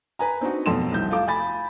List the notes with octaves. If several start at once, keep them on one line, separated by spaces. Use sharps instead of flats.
B4 G#5 A#5
C4 D4 D#4 F#4
F2 B2 F#3 A4 C6 E7
F1 C2 G6
F4 A4 F5 D6
G#5 B5 A6